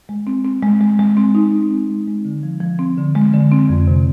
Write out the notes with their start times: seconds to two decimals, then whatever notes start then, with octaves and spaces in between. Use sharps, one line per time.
0.09 G#3
0.27 C4
0.45 C4
0.63 G#3
0.81 G#3
0.99 G#3
1.17 C4
1.35 D#4
1.53 C4
1.71 C4
1.90 G#3
2.08 G#3
2.25 D3
2.43 F3
2.61 F3
2.79 C4
2.98 D3
3.15 G#3
3.34 D3
3.52 C4
3.69 F2
3.87 C3